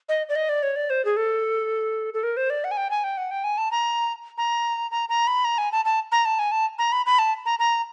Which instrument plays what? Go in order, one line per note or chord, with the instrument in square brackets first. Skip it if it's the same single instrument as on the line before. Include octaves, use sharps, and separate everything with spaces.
[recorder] D#5
D5
D#5
D5
C#5
D5
C5
G#4
A4
A4
A#4
C5
D5
F#5
G#5
G5
G#5
G5
F#5
G5
G#5
A5
A#5
A#5
A#5
A#5
B5
A#5
G#5
A5
A5
A#5
A5
G#5
A5
A#5
B5
B5
A5
A#5
A#5